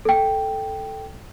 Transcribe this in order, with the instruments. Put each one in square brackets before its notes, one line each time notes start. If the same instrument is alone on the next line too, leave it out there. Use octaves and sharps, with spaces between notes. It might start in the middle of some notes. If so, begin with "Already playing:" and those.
[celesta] A4 G5